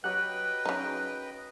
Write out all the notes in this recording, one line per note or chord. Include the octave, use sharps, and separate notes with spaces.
F#3 G4 B4 D#5 F#5 G5 F#6
C#3 F#3 D#4